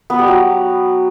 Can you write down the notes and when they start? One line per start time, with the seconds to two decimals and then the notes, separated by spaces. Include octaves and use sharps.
0.10 B3
0.19 G3
0.28 F#3